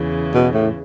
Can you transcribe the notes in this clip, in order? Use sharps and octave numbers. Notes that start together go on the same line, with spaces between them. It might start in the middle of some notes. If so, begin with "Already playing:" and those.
Already playing: E2 C#3 E3
B2
A2